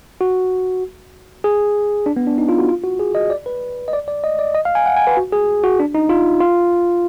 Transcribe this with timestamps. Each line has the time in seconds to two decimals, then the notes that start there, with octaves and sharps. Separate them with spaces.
0.21 F#4
1.44 G#4
2.06 D4
2.16 B3
2.27 D4
2.38 D#4
2.49 F4
2.59 F#4
2.69 F4
2.84 F#4
2.99 G#4
3.15 D#5
3.30 D5
3.46 B4
3.88 D#5
3.93 D5
4.08 D5
4.24 D#5
4.39 D5
4.55 D#5
4.65 F5
4.75 G#5
4.86 F#5
4.97 G#5
5.07 B4
5.17 F#4
5.32 G#4
5.64 F#4
5.80 D4
5.95 D#4
6.09 F4
6.41 F4